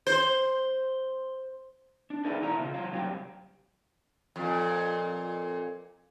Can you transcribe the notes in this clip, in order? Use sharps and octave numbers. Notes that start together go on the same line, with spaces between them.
C5
D4
D#4 G#4 A#4 B4 D5 E5
E2 B2 A3 E4 E5 A#5
C#3 F4
F#3 F4
G2 C3 F#3 G4
F2 A#2